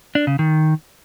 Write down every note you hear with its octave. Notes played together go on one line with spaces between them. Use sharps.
D4
C#3
D#3